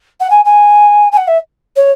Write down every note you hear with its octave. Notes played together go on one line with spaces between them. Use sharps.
F#5
G#5
G#5
G#5
F#5
E5
C#5